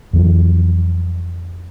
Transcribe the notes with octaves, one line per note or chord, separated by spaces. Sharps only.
F2 E3 F#3